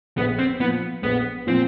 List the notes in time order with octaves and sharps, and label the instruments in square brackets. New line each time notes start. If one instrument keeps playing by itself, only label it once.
[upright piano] A#1 [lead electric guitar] B3
[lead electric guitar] C4
[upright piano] A#2 F3 [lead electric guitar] B3
[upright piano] A#1 [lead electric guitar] B3
[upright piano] A#2 F3 [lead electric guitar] C4